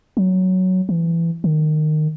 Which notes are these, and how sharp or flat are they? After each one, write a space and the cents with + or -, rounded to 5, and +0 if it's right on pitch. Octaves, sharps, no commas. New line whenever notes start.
F#3 +5
E3 +20
D#3 -20